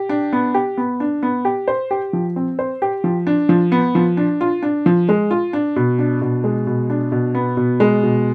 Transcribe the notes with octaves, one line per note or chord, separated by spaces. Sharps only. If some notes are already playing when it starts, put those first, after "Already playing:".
Already playing: G4
D4
B3
G4
B3
D4
B3
G4
C5
G4
F3
C4
C5
G4
F3
D4
F3
B3
F3
D4
F4
D4
F3
G#3
F4
D4
B2
D4
B2
G#3
B2
D4
B2
B3
B2
G#3
B2